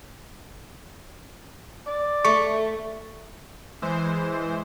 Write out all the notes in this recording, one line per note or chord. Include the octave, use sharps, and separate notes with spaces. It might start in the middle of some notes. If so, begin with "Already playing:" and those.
D5
A3 C#6
E3 G#3 C5